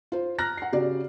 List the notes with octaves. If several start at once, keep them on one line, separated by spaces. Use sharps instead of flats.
F4 C5
A#5 F6 F#6 A#6
F#5 C7
C#3 F#4 G4 D5